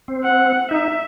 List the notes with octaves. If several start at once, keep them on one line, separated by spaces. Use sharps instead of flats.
C4
F#5
D#4 E5